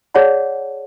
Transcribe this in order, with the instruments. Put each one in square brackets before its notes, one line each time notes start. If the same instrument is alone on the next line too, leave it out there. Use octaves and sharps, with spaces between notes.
[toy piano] G#4 C#5 D5 F#5 A5